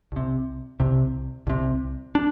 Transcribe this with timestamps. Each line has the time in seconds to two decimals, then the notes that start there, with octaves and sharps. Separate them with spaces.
0.12 C2 C3
0.80 C2 C3
1.47 C2 C3
2.15 D4